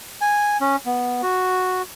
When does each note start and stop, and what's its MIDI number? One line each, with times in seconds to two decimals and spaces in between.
0.21 0.57 80
0.61 0.76 61
0.86 1.22 59
1.22 1.82 66